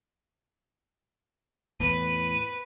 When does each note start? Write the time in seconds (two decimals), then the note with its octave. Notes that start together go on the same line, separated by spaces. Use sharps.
1.80 E2 A2 B4 D#7